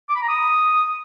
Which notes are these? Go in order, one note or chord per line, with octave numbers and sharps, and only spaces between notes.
D6
B5
A#5
D#6